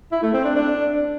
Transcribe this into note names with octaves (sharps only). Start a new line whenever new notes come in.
E4
A3
C4
D4
D4